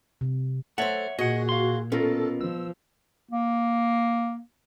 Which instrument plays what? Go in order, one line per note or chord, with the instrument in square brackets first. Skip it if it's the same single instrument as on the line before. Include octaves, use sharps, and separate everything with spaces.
[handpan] C3
[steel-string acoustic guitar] A3 C5 [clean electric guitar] C#5 E5 F#5
[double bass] A#2 [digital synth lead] F#4 [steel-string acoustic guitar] G#4 [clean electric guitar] D#5 F#5
[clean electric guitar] F5 C6
[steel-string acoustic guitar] B2 [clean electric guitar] C#4 F4 A#4 [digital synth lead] A4
[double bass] F3 [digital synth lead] E6
[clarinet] A#3